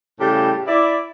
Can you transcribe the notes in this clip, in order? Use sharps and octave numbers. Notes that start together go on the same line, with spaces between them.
A2 C#3 G3 G4 G5 A5
E4 D5